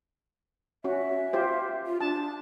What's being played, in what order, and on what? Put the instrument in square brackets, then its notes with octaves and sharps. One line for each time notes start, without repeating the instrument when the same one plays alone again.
[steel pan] C#4 F#4 [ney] E5
[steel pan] F4 G4 C5
[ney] F4
[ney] D4 [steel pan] A5